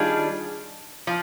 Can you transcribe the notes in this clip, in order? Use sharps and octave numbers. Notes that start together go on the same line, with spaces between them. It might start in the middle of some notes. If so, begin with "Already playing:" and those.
Already playing: D#3 G3 D4 F4 G#4
F3